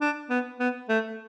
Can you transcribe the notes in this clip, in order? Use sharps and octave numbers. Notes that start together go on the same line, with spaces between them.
D4
B3
B3
A3